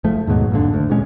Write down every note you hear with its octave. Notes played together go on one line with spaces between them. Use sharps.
F#1 F3 A3
D#2 G#2 B2 F#3
G#1 F2 A#2 D3
D2
A1 A#2 G#3 C#4